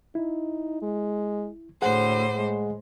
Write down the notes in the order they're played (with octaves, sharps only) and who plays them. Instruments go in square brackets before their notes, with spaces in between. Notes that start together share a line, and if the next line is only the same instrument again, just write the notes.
[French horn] D#4 [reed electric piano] E4
[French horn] G#3
[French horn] D2 [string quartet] A2 C5 [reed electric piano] G#4 F#5
[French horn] G#3